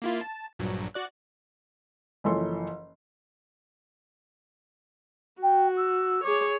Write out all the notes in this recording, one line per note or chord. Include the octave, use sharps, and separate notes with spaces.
A#3 E4 F4
A5
A#1 G2 F#3
F#4 D5 F#6
F#1 E3 F3 A4 C#5 C6
F#4 G5
E6
G#4 C#5 D6